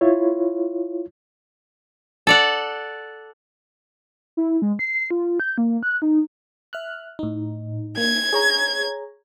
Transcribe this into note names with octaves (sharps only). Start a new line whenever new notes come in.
E4 F4 C#5
A4 D5 F#5
E4
G#3
C7
F4
G6
A#3
F#6
D#4
E5 F6 F#6
A2 D#4
A#3 G#6
G#4 C#5 A#5